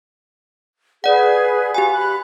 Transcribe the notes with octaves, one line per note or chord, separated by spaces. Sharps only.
G#4 B4 D5 F#5
F#4 G4 F5 G#5
B5 F#6